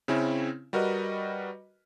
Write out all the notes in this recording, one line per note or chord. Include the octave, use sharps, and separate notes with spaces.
C#3 C4 C#4 E4
G3 F#4 A#4 B4 D#5